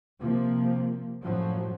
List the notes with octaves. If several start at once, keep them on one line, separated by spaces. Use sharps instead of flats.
C3 F3 A#3
F#2 A2 F3 F#3